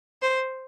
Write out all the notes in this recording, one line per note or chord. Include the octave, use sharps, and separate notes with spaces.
C5